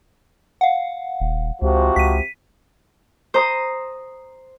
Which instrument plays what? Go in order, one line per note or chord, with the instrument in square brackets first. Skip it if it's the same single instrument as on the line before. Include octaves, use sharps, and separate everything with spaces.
[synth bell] F5 F#5
[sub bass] D#1
[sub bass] C#2 [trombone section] C3 F3 F#4
[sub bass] C#2 [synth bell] B6 D#7
[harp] C5 A#5 D#6